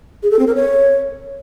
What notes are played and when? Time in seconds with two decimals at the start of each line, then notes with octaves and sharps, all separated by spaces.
0.23 G#4
0.31 A4
0.39 C4
0.47 A#4
0.55 C#5